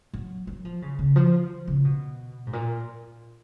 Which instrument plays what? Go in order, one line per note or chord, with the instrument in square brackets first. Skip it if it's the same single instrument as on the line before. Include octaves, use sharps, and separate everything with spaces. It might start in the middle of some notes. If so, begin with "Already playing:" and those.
[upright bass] F#3
F#3
F3
C#3
C#3
F3
C#3
B2
G#2
A#2